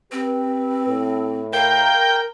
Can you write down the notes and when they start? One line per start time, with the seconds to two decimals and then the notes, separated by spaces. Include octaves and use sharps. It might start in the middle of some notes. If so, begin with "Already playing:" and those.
0.12 C4 G4 B4
0.87 A2
1.53 A#4 F5 G5